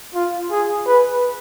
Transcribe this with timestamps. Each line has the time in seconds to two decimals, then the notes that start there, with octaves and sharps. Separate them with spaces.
0.14 F4
0.51 G#4
0.86 B4